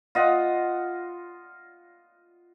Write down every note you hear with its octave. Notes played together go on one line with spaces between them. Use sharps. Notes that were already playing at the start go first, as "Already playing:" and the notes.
F4 D#5 F#5